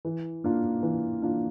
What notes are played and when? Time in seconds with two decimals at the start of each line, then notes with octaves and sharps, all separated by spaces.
0.05 E3
0.44 A#3 D4 F4
0.83 E3
1.22 A#3 D4 F4